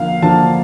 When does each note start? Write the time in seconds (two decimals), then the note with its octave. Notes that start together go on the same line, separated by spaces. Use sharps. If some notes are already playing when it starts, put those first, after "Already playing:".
Already playing: D3 F3 A#3 F5
0.22 D3 F3 A#3 A5